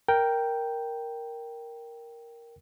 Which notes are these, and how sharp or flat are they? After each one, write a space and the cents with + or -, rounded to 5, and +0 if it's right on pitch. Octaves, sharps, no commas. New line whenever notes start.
A#4 +0 G5 +0